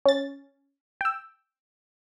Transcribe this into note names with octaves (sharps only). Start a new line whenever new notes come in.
C#4 A6
G5 E6